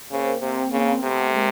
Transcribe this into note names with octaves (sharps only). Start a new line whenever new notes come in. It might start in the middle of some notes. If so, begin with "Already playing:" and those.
C#3 A#3 C4
C3 A#3 C4
C#3 A#3 C4
C3 A3 B3
G#3 A#3